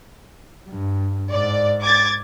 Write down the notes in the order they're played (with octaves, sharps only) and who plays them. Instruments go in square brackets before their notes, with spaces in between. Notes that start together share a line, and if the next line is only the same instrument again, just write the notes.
[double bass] G2
[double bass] G#2 [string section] D5
[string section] D6 G#6 A6